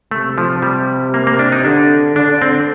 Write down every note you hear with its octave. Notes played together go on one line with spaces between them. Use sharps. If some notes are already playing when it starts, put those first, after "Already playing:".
C3 A3
F3
G3
A#3
A#3
D4
D#4
D3 D4
D3 D4
C4